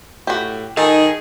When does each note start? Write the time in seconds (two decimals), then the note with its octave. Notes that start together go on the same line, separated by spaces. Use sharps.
0.27 A2 F#4 G4
0.77 D#3 D#4 G#4 A4